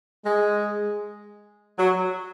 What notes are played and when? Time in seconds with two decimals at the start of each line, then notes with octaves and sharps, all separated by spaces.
0.25 G#3
1.78 F#3